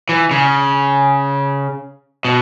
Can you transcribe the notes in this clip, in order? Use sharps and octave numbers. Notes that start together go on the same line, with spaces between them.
E3
C#3
B2